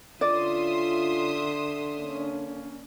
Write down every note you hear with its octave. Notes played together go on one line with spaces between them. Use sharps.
D3 C#4 F4 D5 E5 C6 D#6
A#3 C#4 D4